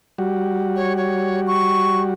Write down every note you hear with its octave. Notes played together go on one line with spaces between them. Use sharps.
G3 F#4
C#5
C#5
C#6